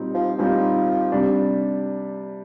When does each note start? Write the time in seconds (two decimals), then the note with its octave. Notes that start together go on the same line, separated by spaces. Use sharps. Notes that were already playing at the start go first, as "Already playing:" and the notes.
Already playing: A#2 G3 C4 D#4
0.15 F3
0.38 A#2 F3 G3 C4 D#4
1.12 C3 G3 D4